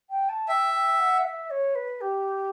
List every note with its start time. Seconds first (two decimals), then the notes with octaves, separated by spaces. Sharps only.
0.10 G5
0.29 A5
0.48 E5 G5
0.73 G5
0.99 F#5
1.24 E5
1.50 C#5
1.75 B4
2.01 G4